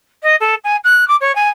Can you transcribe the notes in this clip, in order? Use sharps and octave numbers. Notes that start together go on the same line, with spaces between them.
D#5
A4
G#5
F#6
D6
C#5
G#5